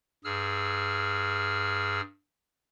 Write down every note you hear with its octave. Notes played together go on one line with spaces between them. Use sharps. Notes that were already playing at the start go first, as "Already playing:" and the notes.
G2 G#4 E6 F6